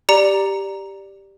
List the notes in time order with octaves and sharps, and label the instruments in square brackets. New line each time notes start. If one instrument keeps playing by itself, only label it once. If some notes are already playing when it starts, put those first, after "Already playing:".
[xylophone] G4 D5 A#5 C#7 F7